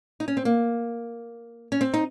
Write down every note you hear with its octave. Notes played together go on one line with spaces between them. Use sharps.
D#4
C#4
C4
A#3
C#4
C4
D#4